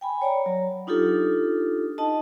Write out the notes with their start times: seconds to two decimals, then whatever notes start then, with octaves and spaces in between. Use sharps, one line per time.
0.01 G5 G#5 B5
0.22 C#5 D5 A#5
0.46 F#3
0.87 D4 D#4 F4 G4 A4
1.98 D#4 D#5 A5